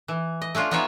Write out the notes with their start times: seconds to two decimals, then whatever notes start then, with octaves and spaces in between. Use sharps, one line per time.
0.08 E3
0.42 D#5
0.55 A3 C#4 D4 F4
0.71 B3 C#4 D#4 F4 C#5 E5